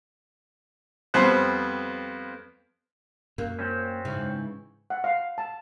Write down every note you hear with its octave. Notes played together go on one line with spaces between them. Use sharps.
F2 G3 B3 C5 F#6
F#2 A#3
F#3 C4 C#4
G#2 C#3 E3
F#5
F5
A5